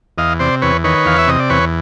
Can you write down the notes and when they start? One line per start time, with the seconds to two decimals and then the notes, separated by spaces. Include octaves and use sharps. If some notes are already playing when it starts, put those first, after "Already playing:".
0.18 E2 D#5 F5
0.39 C3 C5 D5
0.62 E2 B4 C#5
0.84 D#3 B4 C#5
1.05 E2 F5
1.18 E5
1.27 C3 D#5
1.40 D5
1.50 E2 B4 C#5